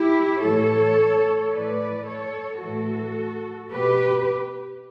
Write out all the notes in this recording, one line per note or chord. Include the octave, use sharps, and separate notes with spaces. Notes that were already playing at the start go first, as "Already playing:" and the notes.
Already playing: E4 G4
A2 E3 A4 C#5
A2 E3 B4 D5
A4 C#5
A2 E3 F#4 A4
B2 G4 B4